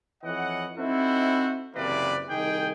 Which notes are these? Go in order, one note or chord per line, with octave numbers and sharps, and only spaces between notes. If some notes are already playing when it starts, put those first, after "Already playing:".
F2 E3 C#5 D#5 F#5
C4 D#4 E4 F#4 A4 C5
F#1 C3 E3 A#3 B4 D5
C2 D#3 D#4 G#4 G5